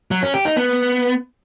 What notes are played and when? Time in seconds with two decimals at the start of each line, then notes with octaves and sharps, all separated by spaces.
0.11 F#3
0.22 C#4
0.34 G4
0.45 D#4
0.57 B3